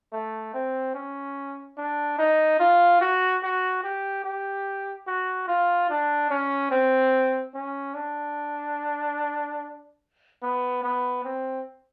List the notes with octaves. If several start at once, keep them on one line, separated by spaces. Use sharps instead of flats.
A3
C4
C#4
D4
D#4
F4
F#4
F#4
G4
G4
F#4
F4
D4
C#4
C4
C#4
D4
B3
B3
C4